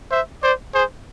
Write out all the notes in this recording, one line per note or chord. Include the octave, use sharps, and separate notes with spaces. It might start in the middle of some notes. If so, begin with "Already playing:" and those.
C5 E5
C5 D5
G#4 C5